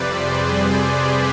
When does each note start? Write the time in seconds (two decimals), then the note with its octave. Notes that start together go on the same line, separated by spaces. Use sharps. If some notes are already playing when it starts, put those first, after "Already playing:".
Already playing: F2 C3 G3 B4 C5 D5
0.15 G#4
0.48 G#4
0.82 G4